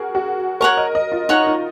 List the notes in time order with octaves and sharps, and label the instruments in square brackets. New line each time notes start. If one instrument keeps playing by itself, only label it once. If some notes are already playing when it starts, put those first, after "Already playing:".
Already playing: [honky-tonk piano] F#4 G#4 A#4
F#4
[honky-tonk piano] A#4 [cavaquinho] C#5 F#5 A#5 C#6
[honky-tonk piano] D#5
D#5
F4
[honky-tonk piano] D#4 [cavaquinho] C#5 F#5 A#5 C#6
[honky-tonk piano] D#4